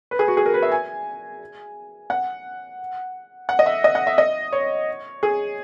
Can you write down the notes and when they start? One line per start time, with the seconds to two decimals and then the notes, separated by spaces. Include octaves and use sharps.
0.11 B4
0.19 G#4
0.28 F#4
0.37 G#4
0.46 A#4
0.54 B4
0.62 E5
0.72 G#5
2.10 F#5
3.49 F#5
3.59 D#5
3.66 E5
3.84 D#5
3.95 F#5
4.07 E5
4.18 D#5
4.52 C#5
5.23 G#4